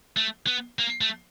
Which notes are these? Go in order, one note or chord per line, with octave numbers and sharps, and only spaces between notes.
A3
B3
A#3
A3